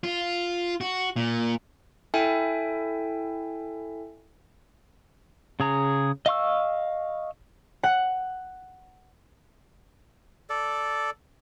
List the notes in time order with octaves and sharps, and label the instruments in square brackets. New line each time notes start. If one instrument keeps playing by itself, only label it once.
[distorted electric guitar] F4
F#4
A#2
[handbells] E4 A4 E5 G5 G#5
[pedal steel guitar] C#3 G#4 A#5
D#5 F5 C#6 E6
[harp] F#5
[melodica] A4 D5